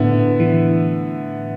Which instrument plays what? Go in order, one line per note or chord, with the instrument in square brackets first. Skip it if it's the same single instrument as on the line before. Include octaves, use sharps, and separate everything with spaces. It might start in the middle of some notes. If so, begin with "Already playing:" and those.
Already playing: [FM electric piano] A2 [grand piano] D3 B3 E4
[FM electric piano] E3